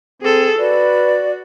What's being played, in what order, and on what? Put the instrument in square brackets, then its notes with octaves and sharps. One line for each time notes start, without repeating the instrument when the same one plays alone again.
[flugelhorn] C4 [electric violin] G#4 A4
[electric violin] F#4 [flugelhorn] B4 [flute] D5